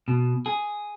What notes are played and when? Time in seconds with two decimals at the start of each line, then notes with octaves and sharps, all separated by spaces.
0.08 B2
0.46 G#4